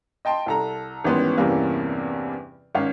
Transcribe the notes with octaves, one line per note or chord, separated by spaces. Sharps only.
D#5 G5 A5 C6
C2 A4 A#5
G#1 E3 G3 B3 C#4 C6
E2 G2 C3 E3 A#3 C#4
G#1 C#4 F5